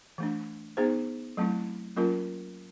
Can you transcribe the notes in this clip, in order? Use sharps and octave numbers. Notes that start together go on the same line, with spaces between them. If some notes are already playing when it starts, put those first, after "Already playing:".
E3 A3 D4
B3 D#4 G#4 C5
F#3 A3 C4 E4
F#3 A#3 C#4 F4 A#4